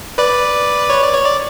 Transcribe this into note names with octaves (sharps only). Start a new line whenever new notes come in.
B4 D5
C#5
D5
C#5
D5